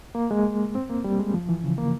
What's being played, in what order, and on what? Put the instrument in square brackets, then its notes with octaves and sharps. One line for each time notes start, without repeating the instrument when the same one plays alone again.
[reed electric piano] A#3
G#3
C4
A#3
G3
G#3
F3
E3
C#3
A#3